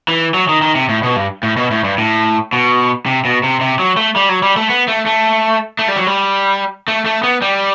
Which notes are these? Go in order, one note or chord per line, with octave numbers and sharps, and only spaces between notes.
E3
F#3
D#3
D#3
C3
A2
B2
G2
A2
B2
A2
G2
A2
B2
C3
B2
C3
C3
F#3
A3
G3
F#3
G3
A3
B3
A3
A3
A3
G3
F#3
G3
A3
A3
B3
G3